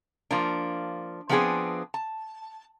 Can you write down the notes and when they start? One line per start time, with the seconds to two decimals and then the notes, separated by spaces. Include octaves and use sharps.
0.31 F3 A#3 D4
1.29 F3 B3 C4 D4 G#4 B4
1.94 A5